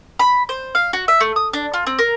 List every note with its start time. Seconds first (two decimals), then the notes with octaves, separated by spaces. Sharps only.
0.19 B5
0.49 C5
0.75 F5
0.93 F#4
1.08 E5
1.21 A3
1.36 D#6
1.53 D4
1.74 F4
1.87 C4
1.99 A#4